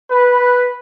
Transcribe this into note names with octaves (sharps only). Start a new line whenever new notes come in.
B4